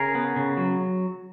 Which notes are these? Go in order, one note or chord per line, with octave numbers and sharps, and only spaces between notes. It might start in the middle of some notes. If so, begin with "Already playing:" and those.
Already playing: C#3 G#4 A#4
B3
C#3
F#3